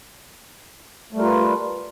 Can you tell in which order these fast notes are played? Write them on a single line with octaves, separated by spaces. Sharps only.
A3 G3 A#4 F4 B4